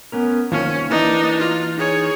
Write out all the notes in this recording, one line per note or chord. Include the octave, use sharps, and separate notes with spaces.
B3 C#4 A#4
C2 D#3 F3 A#3 C#4
E3 D4 D#4
F4
D#4 G#4 C#5